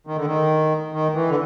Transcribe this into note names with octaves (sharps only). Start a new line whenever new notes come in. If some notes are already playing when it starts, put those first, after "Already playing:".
D#3
D3
D#3
D#3
E3
D3